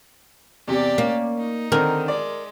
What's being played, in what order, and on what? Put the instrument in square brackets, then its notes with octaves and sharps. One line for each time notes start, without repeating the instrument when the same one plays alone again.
[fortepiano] E2 C3 [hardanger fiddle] G4 D5
[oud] A#3 [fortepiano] C#4
[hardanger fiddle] D#4
[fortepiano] D3 D#3 C4 [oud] A#4
[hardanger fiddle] G#3 [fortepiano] D5